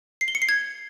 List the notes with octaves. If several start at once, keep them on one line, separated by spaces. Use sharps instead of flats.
C7
G7
C#7
C7
G#6